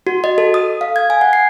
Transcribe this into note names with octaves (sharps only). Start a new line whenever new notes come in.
F#4
D#5
A4
D#6
F5
G#6
G#5
F#5
C7